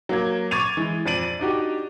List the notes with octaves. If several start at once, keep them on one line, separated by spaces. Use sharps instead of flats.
F#3 A#3 G#6
C#6 D6 G#6 A6 D#7 F7
E3 G#3
F2 D5 A6 D7 D#7 F#7
A6
D4 D#4 F#4 G4